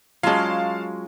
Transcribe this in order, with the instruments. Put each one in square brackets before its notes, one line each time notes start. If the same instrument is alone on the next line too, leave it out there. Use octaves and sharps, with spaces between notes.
[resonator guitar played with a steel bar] F#3 G#3 [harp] C#4 F4 [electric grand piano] F5 A5